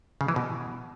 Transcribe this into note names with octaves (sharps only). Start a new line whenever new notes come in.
C#3
E3
B2